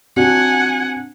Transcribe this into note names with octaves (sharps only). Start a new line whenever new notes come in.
C4 D4 F#4 F#5 G#5